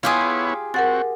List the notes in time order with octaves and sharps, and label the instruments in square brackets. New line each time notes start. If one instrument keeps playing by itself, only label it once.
[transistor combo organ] B3 E4 C#5 [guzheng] F4 G4 G#4
[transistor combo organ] C4 F#4 [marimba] A#4 F#5 A6